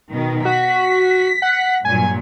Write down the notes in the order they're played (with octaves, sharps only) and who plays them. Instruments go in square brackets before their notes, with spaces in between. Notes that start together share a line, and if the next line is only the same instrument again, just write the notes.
[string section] B2 D#3
[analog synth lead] F#4 [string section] B6
[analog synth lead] F#5
[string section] G2 A#2 F#3 [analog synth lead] G#5